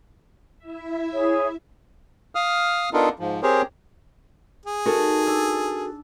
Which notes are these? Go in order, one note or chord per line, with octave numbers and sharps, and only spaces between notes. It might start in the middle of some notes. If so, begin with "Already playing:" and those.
E4 E5
G#4 C#5
F5 D#6 F6
B3 D4 D#4 F4 A4 A#4
G#2 F3
C4 G4 G#4 A#4 C5 C#5
G#4
D#4 F#4 A4 A#4 G#5 A5
D4 A5 E6